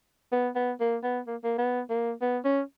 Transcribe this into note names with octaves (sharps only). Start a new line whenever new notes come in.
B3
B3
A#3
B3
A#3
A#3
B3
A#3
B3
C#4